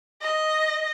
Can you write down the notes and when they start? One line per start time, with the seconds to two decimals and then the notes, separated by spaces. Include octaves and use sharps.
0.22 D#5